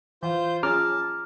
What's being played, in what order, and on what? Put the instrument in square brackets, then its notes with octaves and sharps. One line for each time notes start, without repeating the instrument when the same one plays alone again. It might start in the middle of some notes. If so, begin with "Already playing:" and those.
[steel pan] E3 [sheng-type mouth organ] F4 C5 G6
[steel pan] C#4 F4 G#4 [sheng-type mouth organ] A5 [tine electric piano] A#5 D6 F6